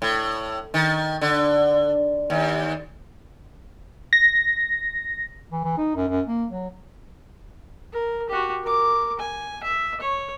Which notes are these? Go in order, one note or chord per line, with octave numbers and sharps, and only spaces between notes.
A2
D#3
D3
D#2
A#6
E3
E3
D#4
F#2
F#2
A#3
F#3
A#4
F#4 G4
A#4 D6
G#5
E5
C#5